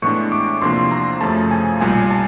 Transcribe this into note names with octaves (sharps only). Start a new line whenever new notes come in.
A2 E3 G#3 B3 D4 C#6
D6
E2 C3 F3 A#3 D4 C6
A#5
F#2 C#3 F3 A3 A5
G#5
B1 A#2 G3 G#5
A5